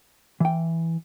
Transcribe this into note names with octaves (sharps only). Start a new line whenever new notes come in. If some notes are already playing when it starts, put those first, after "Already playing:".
E3 G5